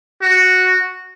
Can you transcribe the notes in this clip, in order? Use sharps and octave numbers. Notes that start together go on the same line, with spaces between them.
F#4